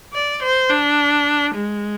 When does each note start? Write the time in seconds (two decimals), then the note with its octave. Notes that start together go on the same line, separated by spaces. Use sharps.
0.13 D5
0.42 C5
0.70 D4
1.55 G#3